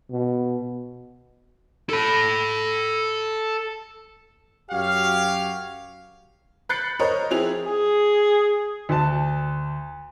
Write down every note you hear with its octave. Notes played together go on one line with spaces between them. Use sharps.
B2
A4 B5
F#2 F#4 G4 C#5 F5
B5 F#6 G6 A6 C7 C#7
A#4 C5 C#5 D#5
F3 C4 E4 G#4 F7
G#4
D2 A5